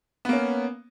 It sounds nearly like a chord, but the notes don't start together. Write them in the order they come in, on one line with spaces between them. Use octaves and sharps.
B3 A#3 C#4